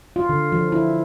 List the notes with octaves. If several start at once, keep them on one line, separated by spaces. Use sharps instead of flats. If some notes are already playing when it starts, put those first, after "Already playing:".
F4
D3
F3
E4